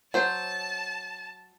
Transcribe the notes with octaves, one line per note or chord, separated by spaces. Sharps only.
F#3 C5 A5